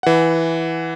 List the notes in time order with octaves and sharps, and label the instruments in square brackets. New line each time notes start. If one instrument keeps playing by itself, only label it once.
[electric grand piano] E3 F#5